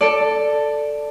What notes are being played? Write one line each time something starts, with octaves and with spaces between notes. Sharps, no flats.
A4 D5